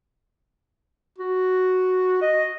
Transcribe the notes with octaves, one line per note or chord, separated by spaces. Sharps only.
F#4
D#5